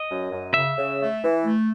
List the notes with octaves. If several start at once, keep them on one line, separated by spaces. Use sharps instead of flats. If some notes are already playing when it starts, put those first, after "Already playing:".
Already playing: D#5
F#2
F#2
C#3 E5
C#3
A3
E3
A3